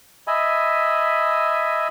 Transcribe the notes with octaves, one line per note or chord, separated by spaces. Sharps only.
D#5 E5 G#5 B5